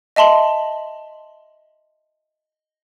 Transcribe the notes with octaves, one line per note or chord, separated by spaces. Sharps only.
D#5 E5 A5 C6 F#7